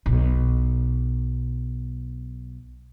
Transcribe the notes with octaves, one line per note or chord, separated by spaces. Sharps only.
B1 B2